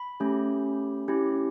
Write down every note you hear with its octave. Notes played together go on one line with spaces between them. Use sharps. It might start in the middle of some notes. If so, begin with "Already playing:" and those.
Already playing: B5
A3 C#4 G4
C#4 E4 G4